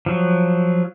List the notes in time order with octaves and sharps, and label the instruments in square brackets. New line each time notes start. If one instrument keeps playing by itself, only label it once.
[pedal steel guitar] F3 F#3